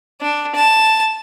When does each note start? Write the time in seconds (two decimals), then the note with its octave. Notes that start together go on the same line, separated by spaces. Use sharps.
0.21 D4
0.55 A5